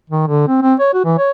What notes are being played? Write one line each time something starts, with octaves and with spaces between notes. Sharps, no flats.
D#3
D3
C4
C4
C#5
F#4
E3
C#5